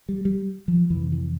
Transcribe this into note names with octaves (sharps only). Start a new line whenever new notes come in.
G3
G3
F3
F2 C3 E3
E3